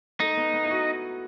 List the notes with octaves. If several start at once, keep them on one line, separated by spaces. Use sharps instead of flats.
A3 D#4
B3
B3
E4
F#4